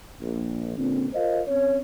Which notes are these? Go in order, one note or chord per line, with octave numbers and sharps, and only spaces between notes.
A#1
C#2 A#2 D3 C4
F4 A#4 C5 D#5 F5
C4 C#4 C#5